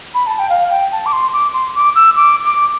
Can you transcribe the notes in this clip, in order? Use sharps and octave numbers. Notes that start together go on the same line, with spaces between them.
B5
A5
G5
F5
G5
A5
D6
C6
D6
C6
D6
E6
D6
D6